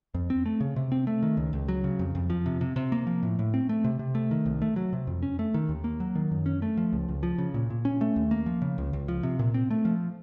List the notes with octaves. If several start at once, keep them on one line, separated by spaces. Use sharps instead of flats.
F2
C4
A3
C#3
C3
C4
A3
D#3
C#2
C#2
F#3
C#3
F2
F2
F3
C3
C3
C3
A#3
F3
A2
A2
C4
A3
C3
C3
A3
D#3
C2
A3
F#3
C3
F2
C#4
A3
D#3
D#2
A#3
F#3
D#3
F#2
C#4
A3
F3
C#2
C#2
F3
C#3
A#2
A#2
C#4
A3
D#2
A#3
F3
C#3
C#2
C#2
F3
C3
A#2
C4
A3
F3